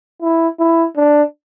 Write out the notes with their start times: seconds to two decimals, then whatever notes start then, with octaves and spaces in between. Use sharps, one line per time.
0.22 E4
0.59 E4
0.97 D4